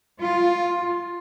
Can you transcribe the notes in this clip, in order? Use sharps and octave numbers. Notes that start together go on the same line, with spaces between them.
F4